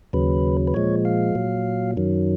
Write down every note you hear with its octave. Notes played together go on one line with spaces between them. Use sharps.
D#2 C#3 F#3 B4
B4
A#2 F3 G#3 C#5
F5
A#2 F#3
F#2 D#3 F#3